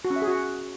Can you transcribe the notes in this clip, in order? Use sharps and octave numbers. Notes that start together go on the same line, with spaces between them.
F#4
C#4
E5
G#4
F#4